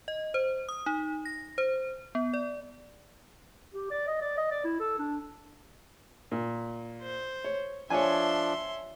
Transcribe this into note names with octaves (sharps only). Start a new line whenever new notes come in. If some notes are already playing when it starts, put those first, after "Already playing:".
D#5
C5
D#6
D#4
A#6
C5
B3
D5
G4
D5
D#5
D5
D#5
D5
E4
A4
D4
A#2
C5
C#5
F3 D4 C#5 E5 G#5 C6